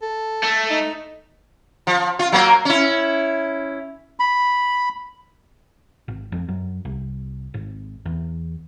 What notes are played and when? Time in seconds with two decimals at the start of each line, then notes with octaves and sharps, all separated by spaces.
0.02 A4
0.44 A3
0.70 D#4
1.87 F3
2.19 F4
2.32 F#3 A#3 A#4
2.65 C#4 E4
4.20 B5
6.08 G#1
6.32 F2
6.48 F#2
6.85 C2
7.54 G#1
8.06 E2